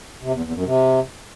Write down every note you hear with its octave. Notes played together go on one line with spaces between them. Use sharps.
C3
E2
E2
F#2
C3